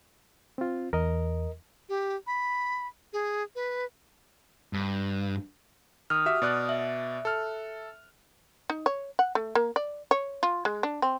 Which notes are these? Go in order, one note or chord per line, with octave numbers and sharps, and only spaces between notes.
C4 F4
E2 A#4 D#5
G4
B5
G#4
B4
G2
D#3 D#6 F6
F#4 G4 E5
B2 D5 F#6
E5
A4 F6
D#4
C#5
F#5
A3
A#3
D5
C#5
F4
G#3
D4
C4